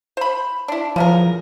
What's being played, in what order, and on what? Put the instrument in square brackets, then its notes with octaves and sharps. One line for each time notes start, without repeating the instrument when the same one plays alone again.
[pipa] C5 B5
D4 E4
[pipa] C#3 B3 A#4 [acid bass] F3